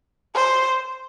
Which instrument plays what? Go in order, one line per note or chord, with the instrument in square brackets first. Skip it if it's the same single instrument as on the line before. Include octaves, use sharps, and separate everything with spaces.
[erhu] C5